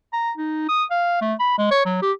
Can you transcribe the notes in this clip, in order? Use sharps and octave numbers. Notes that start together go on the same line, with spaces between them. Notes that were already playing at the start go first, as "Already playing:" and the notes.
A#5
D#4
D#6
F5
A3
B5
G#3
C#5
F#3
G4